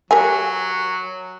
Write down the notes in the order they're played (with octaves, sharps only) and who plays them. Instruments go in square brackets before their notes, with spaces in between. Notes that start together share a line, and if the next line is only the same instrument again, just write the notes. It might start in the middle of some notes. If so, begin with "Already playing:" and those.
[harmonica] F#3 [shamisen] G4 A#4 G#5